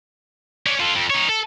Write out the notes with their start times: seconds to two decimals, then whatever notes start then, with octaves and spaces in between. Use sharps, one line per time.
0.67 C#4 D4
0.80 F4 A4
0.95 F2
1.10 D#4 C#5
1.29 A4